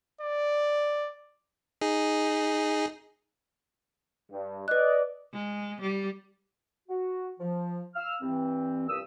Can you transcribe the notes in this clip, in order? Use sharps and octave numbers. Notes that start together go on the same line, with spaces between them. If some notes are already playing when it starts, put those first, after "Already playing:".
D5
D#4 G#4
G2
B4 D5 D#5 F#6
G#3
G3
F#4
F3
F5 E6 F6
G2 E3 C4
C2 G2 A#2 G4 D#6 E6